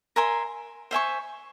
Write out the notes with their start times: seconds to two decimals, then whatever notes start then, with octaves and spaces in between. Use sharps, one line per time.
0.16 A#4 E5 G#5 C6
0.91 C5 E5 G#5 C#6